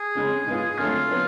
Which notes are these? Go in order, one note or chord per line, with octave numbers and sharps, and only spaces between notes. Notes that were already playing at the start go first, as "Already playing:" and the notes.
Already playing: G#4
F2 C#3 G#3 C#4
G#2 G#3 B3 F4
F2 D3 F#3 A3 F4
F#3 B3